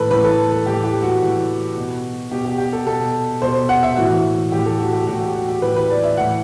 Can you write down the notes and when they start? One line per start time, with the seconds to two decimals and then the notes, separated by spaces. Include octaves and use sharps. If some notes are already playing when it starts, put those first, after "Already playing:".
Already playing: A2 E3 A4 B4
0.10 A2 E3 B4
0.24 A4
0.52 A4
0.66 A2 E3 G4
0.84 G4
1.02 F#4
1.21 A2 E3
1.77 B2
2.31 B2 G4
2.45 G4
2.58 G4
2.73 A4
2.86 B2 A4
3.42 B2 C5
3.69 F#5
3.83 E5
3.97 A2 E3 F#4
4.52 A2 E3 G4
4.66 A4
4.79 F#4
4.93 G4
5.07 A2 E3 F#4
5.21 G4
5.34 F#4
5.48 G4
5.62 A2 E3 B4
5.76 B4
5.90 D5
6.04 E5
6.17 A2 E3 F#5